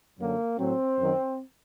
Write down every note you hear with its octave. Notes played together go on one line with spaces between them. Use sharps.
F#2 D3 F#3 A#3
A2 F#3 C4
F#2 D#3 F#3